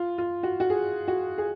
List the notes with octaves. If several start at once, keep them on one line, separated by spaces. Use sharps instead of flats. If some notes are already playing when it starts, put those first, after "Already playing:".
Already playing: F4
F4
F#4
F#4
G#4
F#4
G#4